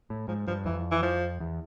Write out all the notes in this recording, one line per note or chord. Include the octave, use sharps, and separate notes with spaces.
A2
G#2 F3
G2 F3
F2 E3
E3
F3
E2